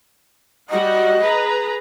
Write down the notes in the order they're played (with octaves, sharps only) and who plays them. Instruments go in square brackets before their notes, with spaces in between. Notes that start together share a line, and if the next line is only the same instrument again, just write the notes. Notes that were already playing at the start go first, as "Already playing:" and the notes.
[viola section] G3 F#4 F#5 [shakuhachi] D#5
[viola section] G#4 B4 A#5